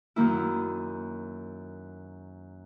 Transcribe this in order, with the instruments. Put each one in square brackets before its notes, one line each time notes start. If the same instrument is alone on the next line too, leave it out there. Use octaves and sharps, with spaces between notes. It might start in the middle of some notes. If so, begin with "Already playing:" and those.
[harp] F#2 D#3 A#3 E4